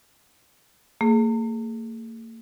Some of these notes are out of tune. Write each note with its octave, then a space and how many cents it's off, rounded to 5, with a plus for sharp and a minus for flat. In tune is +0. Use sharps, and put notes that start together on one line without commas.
A#3 -45 G#4 +10